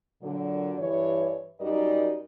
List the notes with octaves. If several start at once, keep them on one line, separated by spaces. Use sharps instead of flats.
A#2 D3 F#3
G2 E3 C#5
F#2 G3 D#4 F#4 A#4 D#5